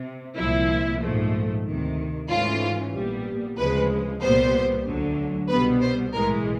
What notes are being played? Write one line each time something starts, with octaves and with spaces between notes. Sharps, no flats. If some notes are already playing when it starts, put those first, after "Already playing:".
Already playing: C3
C2 A#2 F3 E4
A#1 G#2 F3 A3
D2 C3 D#3
G#2 E3 A3 C#4 F4
A#1 A#2 G3 B3
D2 C#3 F3 G#3 B4
C2 A#2 G3 B3 C5
D2 D3 F#3
C2 B2 G3 B3 B4
C5
B1 A2 E3 G#3 A#4